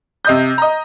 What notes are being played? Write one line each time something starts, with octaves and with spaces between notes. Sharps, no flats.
C3 D#5 G6
D#5 A#5